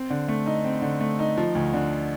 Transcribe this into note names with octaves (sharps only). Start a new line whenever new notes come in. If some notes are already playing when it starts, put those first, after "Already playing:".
Already playing: C4
D3
A3
D#4
C4
D3
A3
D#4
F3
D2
D3